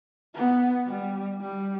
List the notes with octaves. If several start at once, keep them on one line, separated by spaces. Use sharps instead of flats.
B3
G3
G3